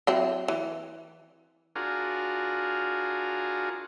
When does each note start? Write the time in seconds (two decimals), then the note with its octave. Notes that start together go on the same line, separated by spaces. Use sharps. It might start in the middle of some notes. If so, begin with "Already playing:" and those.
0.07 F#3 C4 E4
0.48 E3
1.76 D4 F4 F#4 G#4 A#4